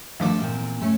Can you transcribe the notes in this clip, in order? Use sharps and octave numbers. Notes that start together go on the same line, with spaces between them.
D#3 F3 A3 D4 A4 D6
E2 A#2 C4
C3 A3 C#4